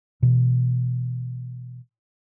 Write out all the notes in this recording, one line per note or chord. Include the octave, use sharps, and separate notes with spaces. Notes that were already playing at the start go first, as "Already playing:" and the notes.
B2 E3